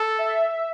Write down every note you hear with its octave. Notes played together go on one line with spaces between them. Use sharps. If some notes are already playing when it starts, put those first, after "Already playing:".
Already playing: A4
E5